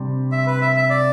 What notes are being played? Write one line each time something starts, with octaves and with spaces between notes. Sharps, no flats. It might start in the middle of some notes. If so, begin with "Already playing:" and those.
Already playing: C3 G3 D4
E5
B4
E5
E5
D5